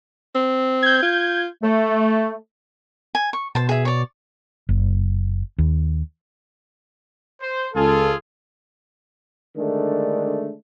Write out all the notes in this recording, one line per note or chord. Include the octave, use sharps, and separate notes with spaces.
C4
G6 G#6
F4
A3
G#5
C#6
B2 C5 A5
G#4 E5
C#5 D5
F#1
D#2
C5
C#2 F4 G#4 A4
D3 D#3 G#3 A3 D4